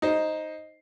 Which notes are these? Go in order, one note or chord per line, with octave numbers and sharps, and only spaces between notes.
D#4 C5